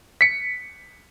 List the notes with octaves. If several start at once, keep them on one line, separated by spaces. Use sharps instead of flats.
B6 C#7